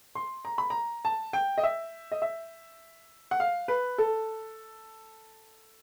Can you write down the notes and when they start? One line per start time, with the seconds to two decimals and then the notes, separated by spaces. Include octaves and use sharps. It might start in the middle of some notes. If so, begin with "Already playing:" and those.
0.15 C6
0.45 A#5
0.58 B5
0.70 A#5
1.05 A5
1.33 G5
1.58 D#5
1.63 E5
2.12 D#5
2.22 E5
3.31 F#5
3.40 F5
3.68 B4
3.98 A4